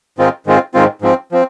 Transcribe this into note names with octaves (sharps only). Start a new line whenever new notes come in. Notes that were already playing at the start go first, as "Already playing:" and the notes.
G#2 D#3 G#3 C4 F4
G#2 D#3 G#3 C4 F4
G#2 D#3 G#3 C4 F4
G#2 F3 C4
F3 C4